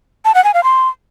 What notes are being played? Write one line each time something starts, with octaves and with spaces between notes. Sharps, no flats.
A5
F#5
G#5
F5
C6